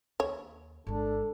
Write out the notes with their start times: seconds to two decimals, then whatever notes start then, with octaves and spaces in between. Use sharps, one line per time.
0.20 D#2 C#5
0.87 G1 G#3 D4 A4